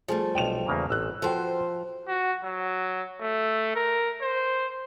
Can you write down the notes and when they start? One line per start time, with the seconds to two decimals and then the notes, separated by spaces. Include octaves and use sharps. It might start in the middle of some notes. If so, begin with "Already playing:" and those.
0.08 F3 G3 A3 G#4
0.35 B1 D5 G5 E7 F7
0.66 E2 C#3 A#3
0.90 A1 E6 F#6
1.22 F3 F#4 A4 B4 C5 G5
2.08 F#4
2.44 F#3
3.20 A3
3.75 A#4
4.22 C5